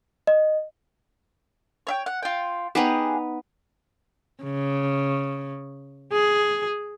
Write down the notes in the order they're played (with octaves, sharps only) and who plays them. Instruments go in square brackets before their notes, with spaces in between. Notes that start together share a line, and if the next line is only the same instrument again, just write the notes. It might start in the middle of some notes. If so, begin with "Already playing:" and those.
[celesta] D#5
[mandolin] C#5 E5 G5
F#5
F4 G5
[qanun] B3 D#4 B4 [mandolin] G4 G#4 F#5
[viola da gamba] C#3
G#4